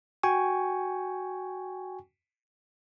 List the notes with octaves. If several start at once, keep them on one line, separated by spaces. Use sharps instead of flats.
F#4 G5 G#5 C#6